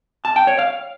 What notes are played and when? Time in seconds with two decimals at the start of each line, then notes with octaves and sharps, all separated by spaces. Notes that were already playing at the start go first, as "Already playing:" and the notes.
0.25 A5
0.36 G5
0.47 C#5
0.59 F5